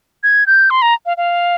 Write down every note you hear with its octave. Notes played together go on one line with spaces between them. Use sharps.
G#6
G6
C6
A#5
F5
F5